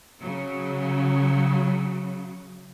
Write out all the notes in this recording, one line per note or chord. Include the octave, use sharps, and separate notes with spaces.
C#3 F#3